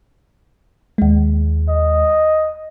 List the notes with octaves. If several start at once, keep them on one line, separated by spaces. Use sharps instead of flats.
D#2 G#3
D#5